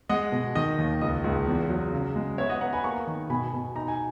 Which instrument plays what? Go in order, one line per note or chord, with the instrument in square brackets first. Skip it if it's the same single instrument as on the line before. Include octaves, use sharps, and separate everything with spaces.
[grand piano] G#3 D#5 F#5
B2
D#3 D#5
D#2
C#2 D#5
C#2
E2
F#3
C#3
G#3
B3 C#5 E5
D#5 F#5
B3 F#5 A#5
G#5 B5
A#3 A#5 C#6
D#3
B2 G#5 B5
B2
D#4 A#5
G#5